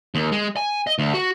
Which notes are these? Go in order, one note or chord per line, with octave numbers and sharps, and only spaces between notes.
D#2
G#3
G#5
D#5
D2
F#4